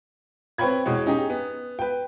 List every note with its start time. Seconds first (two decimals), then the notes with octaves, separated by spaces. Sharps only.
0.58 C4 B4 C#5 G5 B5 G#6
0.86 E2 B2 G#3 C#5
1.06 C#4 D#4 G4 G#4
1.30 B3
1.79 B4 G5